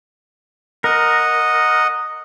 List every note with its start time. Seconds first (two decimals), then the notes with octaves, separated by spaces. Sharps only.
0.84 A#4 D#5 F#5